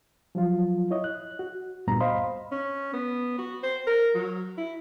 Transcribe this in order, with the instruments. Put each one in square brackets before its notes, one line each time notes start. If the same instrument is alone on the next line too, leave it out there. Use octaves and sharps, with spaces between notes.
[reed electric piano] F3 F#3 F4
E4 C#5 D#5
F#6
F#4
D2 G2 A#2 B3 A#5
C5 D#5 F5 B5 C6
[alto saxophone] C#4
B3
F#4
C5
A#4
F#3
E4